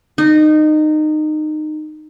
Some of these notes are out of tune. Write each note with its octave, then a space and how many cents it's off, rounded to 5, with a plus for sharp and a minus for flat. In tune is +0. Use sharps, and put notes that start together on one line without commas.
D#4 -20